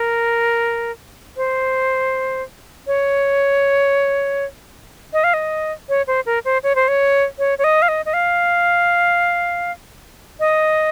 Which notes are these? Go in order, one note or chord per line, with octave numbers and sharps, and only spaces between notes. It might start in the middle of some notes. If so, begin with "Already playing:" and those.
Already playing: A#4
C5
C#5
D#5
F5
D#5
C#5
C5
A#4
C5
C#5
C5
C#5
C#5
C#5
D#5
F5
D#5
D#5
F5
D#5